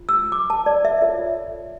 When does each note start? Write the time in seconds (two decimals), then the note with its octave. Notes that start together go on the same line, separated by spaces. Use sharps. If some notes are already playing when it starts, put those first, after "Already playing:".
Already playing: F4
0.09 E6
0.32 D6
0.50 A5
0.66 D5
0.85 E5
1.02 F4 A4 C#5 E5